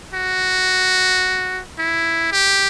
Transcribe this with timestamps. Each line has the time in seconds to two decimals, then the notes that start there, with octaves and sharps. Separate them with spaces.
0.14 F#4
1.78 E4
2.32 G4